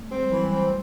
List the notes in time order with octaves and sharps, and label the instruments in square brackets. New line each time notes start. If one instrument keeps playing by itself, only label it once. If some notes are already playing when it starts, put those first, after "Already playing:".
Already playing: [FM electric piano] A3
[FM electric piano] G#3 [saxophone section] C4
[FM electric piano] G3
[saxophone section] E3 [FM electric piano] F#3
[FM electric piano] G3
[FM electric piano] F#3 [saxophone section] C4